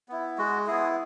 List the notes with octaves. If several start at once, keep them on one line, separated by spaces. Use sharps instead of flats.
B3 E4
G#3 F#4
B3 E4 G#4